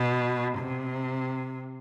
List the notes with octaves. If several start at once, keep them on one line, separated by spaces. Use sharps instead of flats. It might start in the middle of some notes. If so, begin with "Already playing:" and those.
Already playing: B2
C3